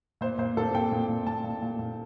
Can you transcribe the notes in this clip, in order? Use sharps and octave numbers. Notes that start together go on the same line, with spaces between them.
A#2 C5
A#2 C5
A#2 A4
A#2 G5
A#2
A#2
A#2 A5
A#2
A#2
A#2